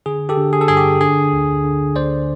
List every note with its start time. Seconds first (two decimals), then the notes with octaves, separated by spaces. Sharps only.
0.06 D3 G#4
0.29 G4 A4
0.37 D3
0.53 G#4
0.61 A4
0.68 G2 G#4
0.77 G4
1.01 D3 G#4
1.33 D2
1.64 D3
1.95 D2 C5 D5